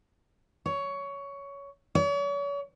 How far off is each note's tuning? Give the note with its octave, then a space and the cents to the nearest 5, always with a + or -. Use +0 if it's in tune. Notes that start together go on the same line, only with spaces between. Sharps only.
C#5 +15
C#5 +40